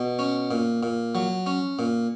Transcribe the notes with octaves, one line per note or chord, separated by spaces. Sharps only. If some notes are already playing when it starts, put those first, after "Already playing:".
Already playing: B2
C#4
A#2
A#2
F#3
C#4
A#2